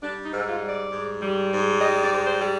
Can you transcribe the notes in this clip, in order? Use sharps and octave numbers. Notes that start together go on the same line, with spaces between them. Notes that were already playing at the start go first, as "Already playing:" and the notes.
G3 D4
D#4
G#2
F4
G3
D5
G#2
G3
G#2
G3 D#5
D5
G#2
C5
G3